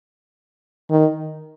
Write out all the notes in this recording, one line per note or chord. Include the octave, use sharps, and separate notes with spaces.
D#3